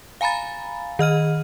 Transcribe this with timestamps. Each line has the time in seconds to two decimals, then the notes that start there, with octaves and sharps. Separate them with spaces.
0.21 F5 G#5 A#5 B5 A6
0.99 D#3 D#5 F6 D#7